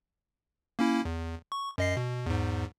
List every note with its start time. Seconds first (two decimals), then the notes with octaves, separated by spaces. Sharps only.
0.79 A#3 C#4 E4
1.05 E2
1.52 C#6
1.78 F#2 D#5 C7
1.97 B2
2.26 E2 G#2